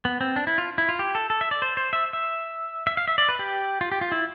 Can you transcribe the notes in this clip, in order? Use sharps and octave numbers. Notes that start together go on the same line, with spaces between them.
B3
C4
D4
E4
F4
E4
F4
G4
A4
A4
E5
D5
C5
C5
E5
E5
E5
F5
E5
D5
B4
G4
F4
G4
F4
E4